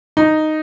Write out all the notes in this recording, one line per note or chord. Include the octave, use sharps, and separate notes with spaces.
D#4